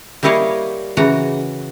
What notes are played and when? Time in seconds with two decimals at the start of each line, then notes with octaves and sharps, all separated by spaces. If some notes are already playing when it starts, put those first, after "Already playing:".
0.23 G3 A#3 E4 C#5 D#5 F5
0.97 C#3 E3 F#4 A#5